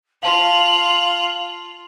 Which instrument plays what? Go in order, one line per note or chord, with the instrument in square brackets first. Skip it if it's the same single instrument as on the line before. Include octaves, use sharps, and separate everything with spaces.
[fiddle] F4 [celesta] F5 A5 C6 [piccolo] F#7